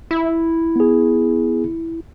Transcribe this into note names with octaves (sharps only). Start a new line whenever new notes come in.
E4
B3 G#4